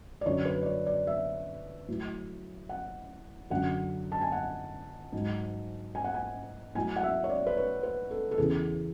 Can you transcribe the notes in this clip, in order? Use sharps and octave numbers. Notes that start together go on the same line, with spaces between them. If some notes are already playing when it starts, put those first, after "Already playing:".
D5
F#2 D3 F#3 C#5
B4
D5
C#5
D5
E5
A2 F#3
F#5
F#2 D3 F#3 F#5
A5
G#5
F#5
G#2 F#3
G#5
F#5
G#5
A2 F#3 G#5
F#5
E5
C#5
D5
B4
C#5
B4
A4
A4
E2 C#3 E3 G#4